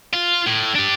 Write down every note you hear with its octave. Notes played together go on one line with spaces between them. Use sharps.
F4
A2
D4 G4